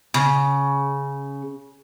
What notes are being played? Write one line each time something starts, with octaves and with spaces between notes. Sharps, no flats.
C#3